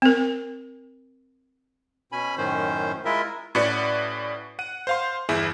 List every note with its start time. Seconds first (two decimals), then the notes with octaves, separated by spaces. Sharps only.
0.02 C4 A#4
2.12 B2 C#4 G#5 B5
2.37 F#2 A2 D#3 C#4 C5
3.05 G#3 E4 F4 A#4 D#5 E5
3.55 A2 C#4 F#4 B4 D5 C#7
4.59 F#5 D#7
4.87 C5 F5 C6
5.29 G1 E2 E4 G#4